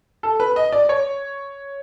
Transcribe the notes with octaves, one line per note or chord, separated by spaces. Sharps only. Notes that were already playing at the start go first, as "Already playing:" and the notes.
A4
B4
D#5
D5
C#5